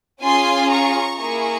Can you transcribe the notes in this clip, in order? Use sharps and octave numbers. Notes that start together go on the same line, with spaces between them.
C#4 F4 G#4 G#5 C6
A#5 C#6
A#3 E4 G#4 A#5 C#6